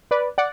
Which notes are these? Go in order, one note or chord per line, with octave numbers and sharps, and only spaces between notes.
B4 D5
D5 F#5